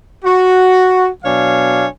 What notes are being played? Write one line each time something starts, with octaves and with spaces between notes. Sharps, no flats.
F#4
B2 F#3 D4 C#5 F5 G#5